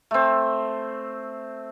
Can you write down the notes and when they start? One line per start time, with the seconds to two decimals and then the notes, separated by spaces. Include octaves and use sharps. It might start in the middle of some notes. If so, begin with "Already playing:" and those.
0.11 A3 C4